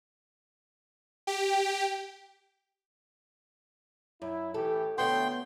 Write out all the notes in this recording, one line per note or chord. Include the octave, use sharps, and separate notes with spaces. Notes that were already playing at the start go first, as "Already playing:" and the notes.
G4
F#2 E4
A2 E3 G4 A4
D3 A3 B3 F#4 C#5 G5 C6